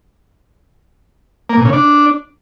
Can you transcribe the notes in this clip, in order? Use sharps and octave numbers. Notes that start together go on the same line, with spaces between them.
A#3
A#2
C#3
D4